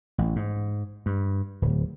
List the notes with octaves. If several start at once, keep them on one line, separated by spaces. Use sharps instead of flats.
A1
G#2
G2
D1